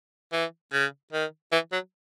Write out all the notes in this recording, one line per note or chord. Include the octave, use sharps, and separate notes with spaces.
E3
C#3
D#3
E3
F#3